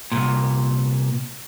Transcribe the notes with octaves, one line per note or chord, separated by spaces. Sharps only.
C2 G2 A#2